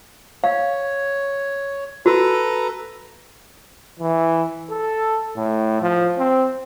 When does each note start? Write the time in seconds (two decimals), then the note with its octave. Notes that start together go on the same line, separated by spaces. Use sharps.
0.44 C#5 F5
2.06 F#4 A4 B4 A#5
4.00 E3
4.70 A4
5.36 A2
5.81 F3
6.18 C4